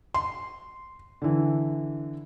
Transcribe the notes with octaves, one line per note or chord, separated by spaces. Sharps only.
C6
D3 E3